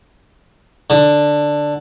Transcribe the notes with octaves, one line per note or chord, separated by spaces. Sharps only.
D3